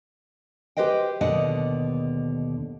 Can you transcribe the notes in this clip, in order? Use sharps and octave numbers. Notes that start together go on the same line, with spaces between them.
G4 B4 C5 D#5 G5
D#2 B2 D3 D4 D#5 F#5